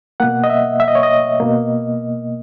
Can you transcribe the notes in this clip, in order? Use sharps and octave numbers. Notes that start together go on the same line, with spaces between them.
B2 A#3 F#5
D#5
E5
E5
D#5
C#5
D#5
B2 A#3